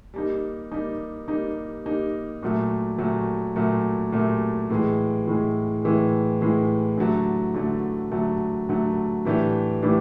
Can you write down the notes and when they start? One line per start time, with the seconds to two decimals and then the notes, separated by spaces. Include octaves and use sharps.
0.14 G3 A#3 D#4
0.72 G3 A#3 D#4
1.28 G3 A#3 D#4
1.85 G3 A#3 D#4
2.43 A#2 F#3 A3
2.98 A#2 F#3 A3
3.56 A#2 F#3 A3
4.12 A#2 F#3 A3
4.70 A2 E3 G#3
5.27 A2 E3 G#3
5.84 A2 E3 G#3
6.41 A2 E3 G#3
6.98 D3 F#3 A3
7.54 D3 F#3 A3
8.12 D3 F#3 A3
8.69 D3 F#3 A3
9.25 A2 E3 A3 D4 G4
9.82 A2 E3 A3 D4 G4